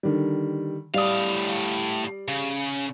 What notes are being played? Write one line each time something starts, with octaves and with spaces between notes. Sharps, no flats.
D3 D#3 G3
A2 G3 D5 F5 D#6
C#3